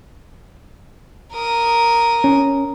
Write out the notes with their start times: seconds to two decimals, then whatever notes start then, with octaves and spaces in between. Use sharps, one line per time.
1.33 A#4 D#6
2.24 C#4